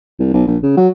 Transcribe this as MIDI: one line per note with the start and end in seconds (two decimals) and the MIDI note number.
0.19 0.30 36
0.34 0.43 35
0.47 0.57 34
0.63 0.74 49
0.77 0.88 54